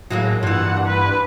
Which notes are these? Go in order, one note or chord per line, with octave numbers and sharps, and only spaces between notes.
A2 F#3 G#3 A#3
G2 A#2 E3 F#5
B4